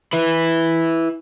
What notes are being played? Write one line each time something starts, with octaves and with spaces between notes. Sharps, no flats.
E4 B4